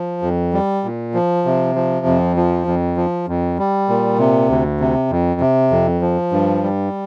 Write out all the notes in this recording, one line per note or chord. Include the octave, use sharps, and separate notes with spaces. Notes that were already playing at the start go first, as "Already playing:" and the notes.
Already playing: F3
F2
G3
A#2
F3
C3
F3
F2
F3
F2
F3
F2
G3
A#2
C3
D2
C3
F2
C3
F2
F3
G2
G3